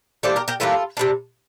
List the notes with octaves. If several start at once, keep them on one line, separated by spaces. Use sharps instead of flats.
E3 G3 A#3 D4 A4 C5
G4 A#4
G4 A#4
E3 G3 A#3 D4 F4 A4
C3 G3 D4